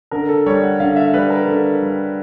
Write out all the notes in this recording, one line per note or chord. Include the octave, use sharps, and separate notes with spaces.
D3 A#4
A4
G3 C#5
F#5
D3 F5
E5
G3 B4
A#4
D3 A4
G3